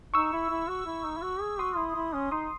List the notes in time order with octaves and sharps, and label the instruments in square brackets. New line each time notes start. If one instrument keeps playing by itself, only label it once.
[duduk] D#4 [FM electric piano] C#6 E6
[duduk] E4
E4
F#4
E4
D#4
E4
F#4
G#4
[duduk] F#4 [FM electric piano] C6 D#6
[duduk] E4
E4
C#4
[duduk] D#4 [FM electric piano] C6 D#6